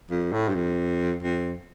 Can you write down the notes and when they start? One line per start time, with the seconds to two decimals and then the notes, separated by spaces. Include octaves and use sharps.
0.11 F2
0.33 A2
0.49 G2
0.55 F2
1.23 F2